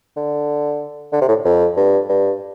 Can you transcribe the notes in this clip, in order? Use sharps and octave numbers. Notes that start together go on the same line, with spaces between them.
D3
D3
C3
A2
F2
G2
G2